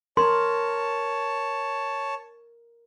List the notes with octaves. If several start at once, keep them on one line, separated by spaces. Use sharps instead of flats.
A#4 C#5 A5 C6